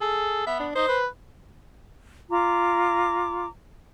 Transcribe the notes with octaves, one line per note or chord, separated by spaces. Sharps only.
G#4 A4
B3 E5
D4
D#4 C5
B4
F4 A#5 D6